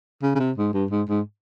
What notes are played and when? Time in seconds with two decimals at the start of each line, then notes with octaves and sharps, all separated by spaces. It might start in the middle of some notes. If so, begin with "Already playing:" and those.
0.22 C#3
0.35 C#3
0.39 C3
0.57 G#2
0.73 G2
0.91 G#2
1.09 G#2